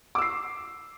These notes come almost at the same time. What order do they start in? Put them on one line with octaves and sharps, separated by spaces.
D6 E6 C7